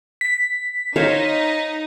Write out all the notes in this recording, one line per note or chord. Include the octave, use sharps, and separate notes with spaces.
B6
D#4 C5 C#5 F5